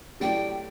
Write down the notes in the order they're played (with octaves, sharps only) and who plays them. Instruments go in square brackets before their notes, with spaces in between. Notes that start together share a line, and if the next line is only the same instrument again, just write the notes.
[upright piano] F#3 A3 E4 G4 D5 [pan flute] G5